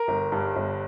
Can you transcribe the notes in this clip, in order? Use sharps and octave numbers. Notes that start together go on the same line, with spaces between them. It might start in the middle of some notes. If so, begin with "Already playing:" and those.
Already playing: A#4
G1
G2
G1